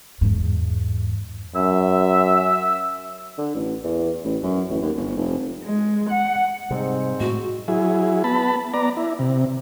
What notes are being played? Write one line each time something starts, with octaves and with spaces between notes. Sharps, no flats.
E2 G#2
F#2 E5
D3
A1
E2
A1
F#2
A1
D#2
G1
F1
G#3
F#5
G#2 C3 G3 C4
A2 G#3 F#4
F#3 E4 G#4
B3 A5 B5
B3 D5 A#5
E4
C3